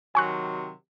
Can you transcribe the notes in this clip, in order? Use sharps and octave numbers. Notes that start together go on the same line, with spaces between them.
C3 D#3 F#3 G#5 C#6 F#6